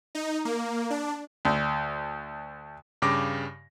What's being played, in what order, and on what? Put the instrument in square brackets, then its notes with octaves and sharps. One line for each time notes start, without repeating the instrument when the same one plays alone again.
[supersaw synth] D#4
A#3
D4
[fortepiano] D2
[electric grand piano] G2 C#3 G4 D6 A#6